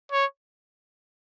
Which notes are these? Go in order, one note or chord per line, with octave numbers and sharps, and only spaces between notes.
C#5